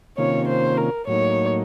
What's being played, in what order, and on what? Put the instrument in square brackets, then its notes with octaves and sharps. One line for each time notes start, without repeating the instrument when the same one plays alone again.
[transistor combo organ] C3 D#3 A#3 C#4 F4 [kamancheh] C#5
[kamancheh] C5
A#4
[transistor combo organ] A2 F#3 A#3 D#4 [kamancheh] C#5